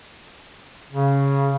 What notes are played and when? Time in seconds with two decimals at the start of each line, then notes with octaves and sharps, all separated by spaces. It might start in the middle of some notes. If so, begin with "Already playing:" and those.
0.93 C#3